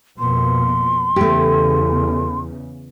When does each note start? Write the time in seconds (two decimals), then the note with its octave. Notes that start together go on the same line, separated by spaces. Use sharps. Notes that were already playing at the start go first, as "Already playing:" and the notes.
0.19 F2 B2 A#3 C6
1.16 E2 C#3 A3 G4